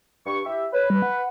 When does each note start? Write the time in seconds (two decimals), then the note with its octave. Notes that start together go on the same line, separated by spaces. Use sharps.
0.26 G2 C#6
0.46 E4 G4 E5
0.73 B4 C#5
0.90 G3
1.02 F#5